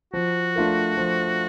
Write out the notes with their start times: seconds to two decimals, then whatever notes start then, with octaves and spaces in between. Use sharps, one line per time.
0.13 F3 F#4
0.56 A3 D4 F4 A#4
0.97 F3